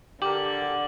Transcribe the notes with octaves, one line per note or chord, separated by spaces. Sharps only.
D3 G4 A#4 D6 F#7